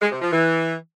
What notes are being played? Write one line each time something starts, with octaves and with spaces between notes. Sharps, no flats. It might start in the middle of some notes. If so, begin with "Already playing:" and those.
G#3
C3
F3
E3